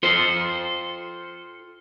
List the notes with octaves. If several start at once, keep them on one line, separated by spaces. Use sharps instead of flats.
F4 A4 C5